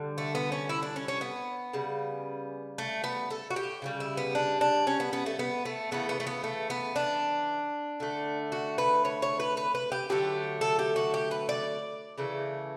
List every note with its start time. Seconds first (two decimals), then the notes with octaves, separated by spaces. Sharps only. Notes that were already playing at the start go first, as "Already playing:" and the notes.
Already playing: D3 G3
0.18 A3
0.35 B3
0.52 C#4
0.69 E4
0.82 D4
0.96 C#4
1.08 C#4
1.21 B3
1.73 C#3 G3
2.78 A3
3.04 B3
3.30 A4
3.50 F#4
3.56 G4
3.82 C#3 E3 G3
4.00 E4
4.17 B3
4.35 D4
4.61 D4
4.87 C#4
5.00 B3
5.13 B3
5.26 A3
5.39 B3
5.65 A3
5.91 C#3 E3 A3 B3
6.09 B3
6.20 A3
6.27 B3
6.44 A3
6.70 B3
6.96 D4
8.00 D3 A3
8.52 F#4
8.78 B4
9.05 C#5
9.22 C#5
9.40 B4
9.57 B4
9.75 B4
9.92 G4
10.09 D3 F#3 A3 G4
10.61 A4
10.79 G4
10.96 F#4
11.14 G4
11.31 B4
11.49 D5
12.18 C#3 E3 A3